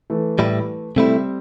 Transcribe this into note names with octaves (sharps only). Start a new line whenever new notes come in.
E3 A3
A2 G3 E4
C3 G3 A3 C4 E4